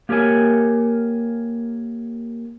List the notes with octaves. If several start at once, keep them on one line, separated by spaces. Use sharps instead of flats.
A#3 G4 A#4 C#5 G#5